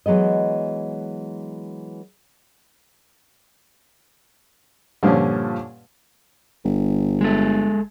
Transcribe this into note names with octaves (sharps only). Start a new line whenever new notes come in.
E3 F#3 G#3 B3 D#5
G2 A#2 D3 F3 C#4
G1
G#3 A4